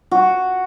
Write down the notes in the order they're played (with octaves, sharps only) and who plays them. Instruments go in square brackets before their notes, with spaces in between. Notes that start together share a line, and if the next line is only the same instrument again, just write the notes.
[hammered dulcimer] F#4